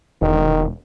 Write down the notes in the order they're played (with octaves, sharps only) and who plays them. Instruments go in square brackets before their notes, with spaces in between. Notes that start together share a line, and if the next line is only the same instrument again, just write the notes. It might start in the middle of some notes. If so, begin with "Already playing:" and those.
[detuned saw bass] E1 [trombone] D#3